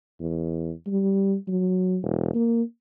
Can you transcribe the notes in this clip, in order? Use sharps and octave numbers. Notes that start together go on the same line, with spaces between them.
E2
G3
F#3
E1
A#3